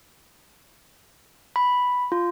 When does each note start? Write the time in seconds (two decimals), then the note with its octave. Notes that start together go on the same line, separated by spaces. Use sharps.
1.56 B5
2.12 F4